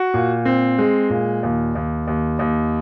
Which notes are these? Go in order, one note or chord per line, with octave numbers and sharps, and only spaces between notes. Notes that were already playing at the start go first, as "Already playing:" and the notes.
Already playing: F#4
A#2
C4
G#3
A#2
D#2
D#2
D#2
D#2